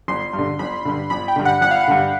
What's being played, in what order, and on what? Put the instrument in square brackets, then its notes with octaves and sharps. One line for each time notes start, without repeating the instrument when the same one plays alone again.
[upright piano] G1 [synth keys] C6
[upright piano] G2
D3
[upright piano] G1 [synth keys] B5
[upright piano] G2 D3
[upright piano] G1 [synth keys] B5
[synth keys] G5
[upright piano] G2 D3
[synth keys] F#5
[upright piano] G1 [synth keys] F#5
[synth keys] F5
F#5
[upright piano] G2 D3